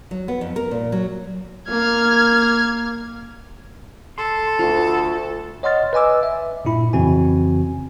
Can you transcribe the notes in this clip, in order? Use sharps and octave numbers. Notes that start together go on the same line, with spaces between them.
F#3
B3
F2
A#4
A#2
F#3
A#3 F6 G#6
A4 C6
D2 F4 F#4
C#5 D#5 F#5 C6 F6 A6
B4 D#5 G#5 D6 E6
E5
G2 A#2 E4 B5
F2 C#3 E3 C4 F#4 G#5